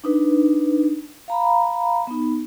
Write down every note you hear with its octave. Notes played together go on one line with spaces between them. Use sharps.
D4 D#4 B4
F5 A#5 B5
B3 D#4